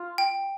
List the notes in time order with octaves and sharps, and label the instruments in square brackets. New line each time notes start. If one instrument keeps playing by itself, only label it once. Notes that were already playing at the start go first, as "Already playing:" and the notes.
Already playing: [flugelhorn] F4
[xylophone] G5